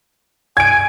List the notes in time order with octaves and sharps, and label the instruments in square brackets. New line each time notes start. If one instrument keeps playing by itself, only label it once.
[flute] G#5 [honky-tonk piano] G#6 D7